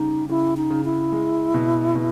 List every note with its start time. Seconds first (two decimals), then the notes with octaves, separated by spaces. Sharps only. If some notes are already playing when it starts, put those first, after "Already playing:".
Already playing: C#3 G3 D#4
0.29 C#3 E4
0.57 D#4
0.70 C#3
0.85 E4
1.12 G#3
1.54 B2
1.95 B2